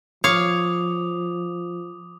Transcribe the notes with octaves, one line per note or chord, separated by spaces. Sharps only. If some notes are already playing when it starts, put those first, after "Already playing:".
F3 C#5 F5 D6 D#6 F7